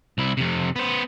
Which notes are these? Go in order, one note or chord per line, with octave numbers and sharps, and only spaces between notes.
C2 E4
F2 C3
B3 C5